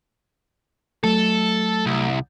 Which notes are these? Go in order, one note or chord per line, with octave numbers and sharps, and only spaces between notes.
F#3 A3 A4
C2